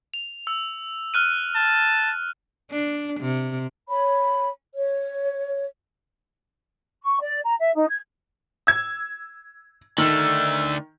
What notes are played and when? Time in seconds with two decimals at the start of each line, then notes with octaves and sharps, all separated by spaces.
0.14 F7
0.47 E6
1.14 F6 F#6 D#7
1.55 A5
2.71 D4
3.20 C3
3.88 C#5 B5
4.74 C#5
7.03 C#6
7.20 D5
7.44 A#5
7.59 E5
7.75 D#4
7.88 G#6
8.67 E6 G#6
9.98 D3 D#3 A3 E6